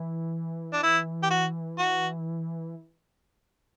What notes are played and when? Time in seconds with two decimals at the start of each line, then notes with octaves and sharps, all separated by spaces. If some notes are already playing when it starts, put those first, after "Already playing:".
Already playing: E3
0.73 D4
0.83 E4
1.23 G4
1.31 F#4
1.79 F#4